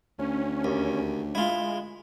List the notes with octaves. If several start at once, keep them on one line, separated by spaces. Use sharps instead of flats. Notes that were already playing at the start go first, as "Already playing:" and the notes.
D2 C#4
D#2
G#3 E4 F4